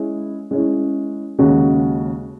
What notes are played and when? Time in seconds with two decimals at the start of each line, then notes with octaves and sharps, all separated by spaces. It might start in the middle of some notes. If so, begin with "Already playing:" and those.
Already playing: G#3 C#4 E4
0.51 G#3 C#4 E4
1.39 D#2 C#3 G#3 C#4 F#4